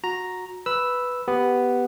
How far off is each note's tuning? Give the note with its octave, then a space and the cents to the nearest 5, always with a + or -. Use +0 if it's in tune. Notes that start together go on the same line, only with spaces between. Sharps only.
F#4 -20 A#5 +0
B4 +0 B5 +0 E6 +0
B3 +0 G4 +0 B4 +0